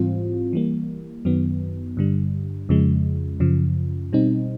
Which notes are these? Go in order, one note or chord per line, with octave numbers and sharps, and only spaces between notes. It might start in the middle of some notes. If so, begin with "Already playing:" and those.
Already playing: G#2 E3 G3 C4 F4
E3 G3 A#3
F#2 D#3 F#3 B3
G2 D3 G3
F2 C#3 F3 G#3
F#2 C#3 F3
B2 G3 C4 D#4